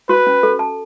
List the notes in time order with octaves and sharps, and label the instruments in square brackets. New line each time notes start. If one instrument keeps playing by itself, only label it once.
[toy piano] F#4 [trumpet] B4
[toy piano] C#4
A4
A5